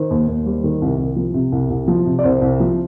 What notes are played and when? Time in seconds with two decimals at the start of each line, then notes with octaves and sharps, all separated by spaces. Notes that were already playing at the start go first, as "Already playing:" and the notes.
Already playing: D#3 C5
0.10 D#2
0.27 D#2
0.46 G3
0.64 D#3
0.82 C2
0.99 C2
1.16 F3
1.34 C3
1.52 C2
1.70 C2
1.88 F3
2.06 C3
2.19 D5
2.24 C2 C5
2.41 C2
2.60 F3